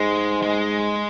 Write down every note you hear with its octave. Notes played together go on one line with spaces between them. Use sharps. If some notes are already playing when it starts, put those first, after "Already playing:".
Already playing: G#2 G#3
G#3